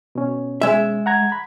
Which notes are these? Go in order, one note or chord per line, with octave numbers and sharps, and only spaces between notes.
B2 C#4
G#3 E5
F#5 A#5 G#6
B5